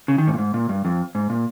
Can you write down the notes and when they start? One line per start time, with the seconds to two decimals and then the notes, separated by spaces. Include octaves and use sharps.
0.08 C#3
0.18 D#3
0.28 G#2
0.34 A#2
0.38 G#2
0.54 A#2
0.69 G2
0.85 F2
1.15 G#2
1.30 A#2